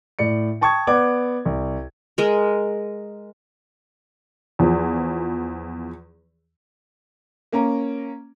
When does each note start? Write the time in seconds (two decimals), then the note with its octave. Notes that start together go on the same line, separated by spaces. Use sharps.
0.19 A2 D5 C#7
0.61 G5 A5 C#6 D#6 G#6
0.87 B3 D5 F#5 D6 G#6
1.45 C2
2.18 G#3 A#4
4.59 E2 F3
7.52 A#3 C#4 A#5